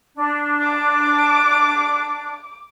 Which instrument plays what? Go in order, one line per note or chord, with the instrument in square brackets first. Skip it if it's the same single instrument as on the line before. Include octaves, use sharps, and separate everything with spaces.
[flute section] D4
[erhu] D6